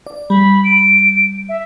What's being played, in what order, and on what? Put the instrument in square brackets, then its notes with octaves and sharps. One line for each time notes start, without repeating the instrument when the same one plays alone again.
[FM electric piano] D5
[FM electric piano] G3 [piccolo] B5
[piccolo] D7
E5